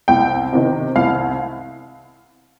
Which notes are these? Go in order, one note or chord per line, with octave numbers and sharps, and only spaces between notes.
C2 G5
C3 D#3
C2 F5